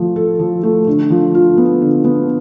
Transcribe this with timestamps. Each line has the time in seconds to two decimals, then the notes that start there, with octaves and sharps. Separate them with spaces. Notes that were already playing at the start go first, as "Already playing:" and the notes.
Already playing: F3 A3
0.16 A4
0.39 F3
0.63 A3
0.87 D3
1.10 F3
1.35 F4
1.57 B3
1.82 D3
2.05 B3